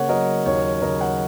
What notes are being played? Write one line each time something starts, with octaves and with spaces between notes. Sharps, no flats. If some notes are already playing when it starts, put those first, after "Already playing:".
Already playing: C#3 A#3 C#5 F#5
F#3 A#4 D#5
D#2 C#5
C#3 A#4 D#5
C#5 F#5